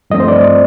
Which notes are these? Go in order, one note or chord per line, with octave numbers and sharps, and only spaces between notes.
G2 F3 A3 C4 D#5
C5
D5